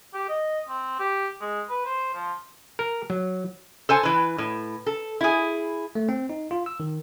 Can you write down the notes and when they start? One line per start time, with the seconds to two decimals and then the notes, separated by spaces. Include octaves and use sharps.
0.14 G4
0.29 D#5
0.69 C4
0.99 G4
1.41 G#3
1.70 B4
1.85 C5
2.14 F3
2.79 A#4
3.10 F#3
3.89 A4 C5 G#5 A5
4.03 E3 B4
4.38 A2
4.86 A4
5.21 E4 G#4
5.95 A3
6.09 C4
6.30 D#4
6.51 F4
6.66 E6
6.80 D#3